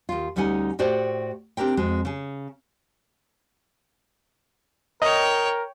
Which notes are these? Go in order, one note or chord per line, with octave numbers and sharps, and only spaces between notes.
D#2 F4
D2 G3 C#4 D#4 F#5 G#5
A2 F#4 G4 C5 D5
C4 D4 G4 A#4 G5
F2 G#3 F#4
C#3 G#4
A#4 C#5 D#5 G5